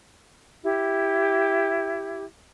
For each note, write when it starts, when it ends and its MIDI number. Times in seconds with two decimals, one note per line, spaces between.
0.62 2.23 64
0.62 2.23 67